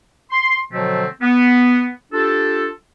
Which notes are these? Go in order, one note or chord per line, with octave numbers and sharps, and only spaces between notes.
C6
B2 D3 F3 F#3 A3 C4
B3
D4 F4 G4 A4